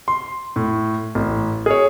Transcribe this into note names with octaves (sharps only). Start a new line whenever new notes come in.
C6
A2
A1
G#4 C#5